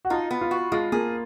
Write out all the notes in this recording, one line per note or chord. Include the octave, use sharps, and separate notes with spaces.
F#4
D#4 F4
B3
F4
F#4
G#3 F4
A#3 G#4